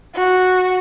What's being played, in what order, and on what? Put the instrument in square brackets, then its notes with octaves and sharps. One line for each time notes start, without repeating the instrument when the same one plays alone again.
[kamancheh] F#4